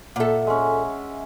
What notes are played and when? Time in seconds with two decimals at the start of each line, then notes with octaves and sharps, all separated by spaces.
0.16 A#2 A4 E5 F#5
0.47 G#3 C#4